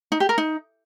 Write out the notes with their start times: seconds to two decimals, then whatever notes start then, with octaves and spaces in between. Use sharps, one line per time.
0.12 D#4
0.20 G4
0.29 A#4
0.38 D#4